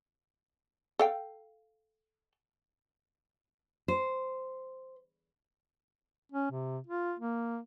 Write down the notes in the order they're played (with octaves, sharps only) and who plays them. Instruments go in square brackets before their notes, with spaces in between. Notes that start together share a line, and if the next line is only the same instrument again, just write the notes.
[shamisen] A4 F5 G5
[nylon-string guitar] C5
[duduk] C#4
C3
F4
A#3